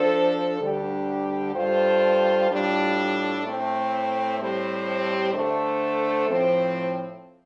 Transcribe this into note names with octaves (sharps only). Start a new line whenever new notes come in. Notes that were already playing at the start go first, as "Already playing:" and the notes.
Already playing: F3 D4 A4 C5
D2 D3 G3 D4 G4
G2 G3 F4 A4 C5
A2 G3 D4 F4 A4
A2 A3 C4
A2 G3 C4 G4 C5
D3 A3 D4 A4 C5
A2 F3 C4